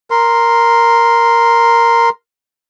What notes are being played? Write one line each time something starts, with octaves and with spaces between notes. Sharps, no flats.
A#4 C6